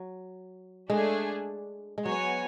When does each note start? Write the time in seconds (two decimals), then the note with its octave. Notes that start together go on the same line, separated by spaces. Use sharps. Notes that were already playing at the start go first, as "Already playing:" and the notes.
Already playing: F#3
0.90 G#3 A3 D4 G#4
1.98 G#3
2.05 F#3 B3 F#4 C#5 G#5